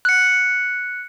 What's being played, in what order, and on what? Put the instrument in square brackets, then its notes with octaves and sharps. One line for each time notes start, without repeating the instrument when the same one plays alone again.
[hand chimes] F#6 C#7